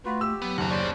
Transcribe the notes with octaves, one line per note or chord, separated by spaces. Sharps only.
A3 F4 F#4 B4
G4 E6
F#3 B3
F#1 D#2 F#5 A#5
C#4 G#4 C5 D5